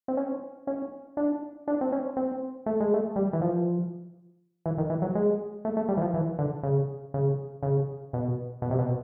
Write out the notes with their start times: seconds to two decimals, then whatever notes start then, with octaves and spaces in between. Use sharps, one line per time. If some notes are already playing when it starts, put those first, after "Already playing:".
0.08 C4
0.17 C#4
0.67 C#4
1.17 D4
1.68 D4
1.81 C4
1.92 C#4
2.17 C4
2.66 A3
2.80 G#3
2.94 A3
3.16 G3
3.33 E3
3.41 F3
4.66 E3
4.78 D#3
4.90 E3
5.02 F#3
5.15 G#3
5.65 A3
5.77 A3
5.89 G3
5.97 E3
6.02 F3
6.14 E3
6.39 D3
6.63 C#3
7.14 C#3
7.63 C#3
8.13 B2
8.62 B2
8.71 C3
8.78 B2